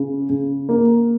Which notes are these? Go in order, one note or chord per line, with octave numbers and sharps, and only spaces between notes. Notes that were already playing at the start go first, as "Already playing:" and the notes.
Already playing: C#3
C#3
A#3